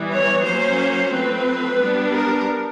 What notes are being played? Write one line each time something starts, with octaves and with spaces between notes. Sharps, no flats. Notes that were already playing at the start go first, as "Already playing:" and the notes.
Already playing: E3 G3 B3
C#5
F#3 A#3 C#4 C5
F3 A3 C4 B4
G3 B3 D4
A#4